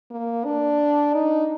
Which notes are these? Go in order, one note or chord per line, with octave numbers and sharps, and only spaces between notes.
A#3
D4
D#4